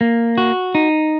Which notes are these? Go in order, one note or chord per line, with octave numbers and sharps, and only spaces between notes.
A#3
F#4
D#4